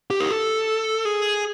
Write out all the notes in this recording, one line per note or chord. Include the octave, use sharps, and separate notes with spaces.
G4
A#4
A4
G#4